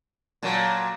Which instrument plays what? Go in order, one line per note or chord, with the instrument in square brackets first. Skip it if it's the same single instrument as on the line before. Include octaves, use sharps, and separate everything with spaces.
[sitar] A#2 F#3 [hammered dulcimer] A#3 A5 D6